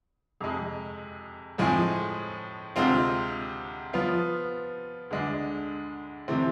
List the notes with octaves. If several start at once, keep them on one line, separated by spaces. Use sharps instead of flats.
F2 C3 G#3
A2 F3 G#3 C4 G#4
D2 C3 G#3 C4 F4
F3 B3 F4
D2 D3 G#3 D4
C3 E3 A3 C4